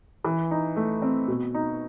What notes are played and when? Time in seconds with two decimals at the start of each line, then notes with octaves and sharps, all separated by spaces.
0.24 E3
0.51 D#4
0.76 A3
1.02 C4
1.28 B2
1.54 D#4